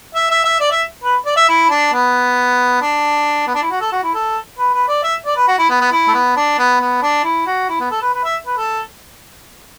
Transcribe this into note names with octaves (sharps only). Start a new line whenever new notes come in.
E5
E5
E5
D5
E5
B4
D5
E5
E4
D4
B3
D4
B3
D4
E4
F#4
A4
F#4
E4
A4
B4
B4
D5
E5
D5
B4
F#4
E4
B3
B3
E4
A3
B3
D4
B3
B3
D4
E4
F#4
E4
B3
A4
B4
B4
E5
B4
A4